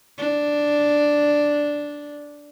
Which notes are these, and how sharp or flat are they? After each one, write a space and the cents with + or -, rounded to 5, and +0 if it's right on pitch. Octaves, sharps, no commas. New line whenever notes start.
D4 +0